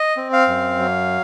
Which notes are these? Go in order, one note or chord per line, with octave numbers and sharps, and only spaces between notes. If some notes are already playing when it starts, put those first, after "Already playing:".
Already playing: D#5
C4
F5
F#2
F#3